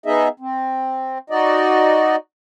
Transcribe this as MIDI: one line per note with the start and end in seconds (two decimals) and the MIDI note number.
0.06 0.28 59
0.06 0.28 63
0.06 0.28 68
0.06 0.28 75
0.06 0.28 76
0.40 1.18 60
1.30 2.16 63
1.30 2.16 66
1.30 2.16 74
1.30 2.16 75